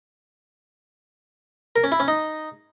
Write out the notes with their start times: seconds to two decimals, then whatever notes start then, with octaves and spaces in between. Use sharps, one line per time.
1.76 A#4
1.84 C#4
1.92 E4
2.00 C#4
2.08 D#4